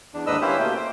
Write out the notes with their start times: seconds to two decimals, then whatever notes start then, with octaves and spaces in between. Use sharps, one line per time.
0.14 E2 D4
0.26 D#2 G#2 D4 B4 D#5 E6
0.41 A#3 C#4 E4 G4 B4 C5
0.59 B2 A3 A#3 G5
0.76 C5